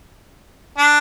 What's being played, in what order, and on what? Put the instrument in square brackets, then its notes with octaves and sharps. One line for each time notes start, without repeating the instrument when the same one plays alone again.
[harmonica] D4